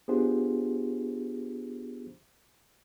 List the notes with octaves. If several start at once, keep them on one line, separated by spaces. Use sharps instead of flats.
B3 D4 F4 G4 G#4 C5